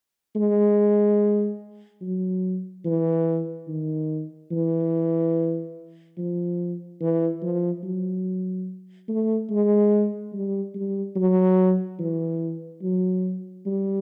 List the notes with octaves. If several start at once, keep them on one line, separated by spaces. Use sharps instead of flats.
G#3
F#3
E3
D#3
E3
F3
E3
F3
F#3
A3
G#3
G3
G3
F#3
E3
F#3
G3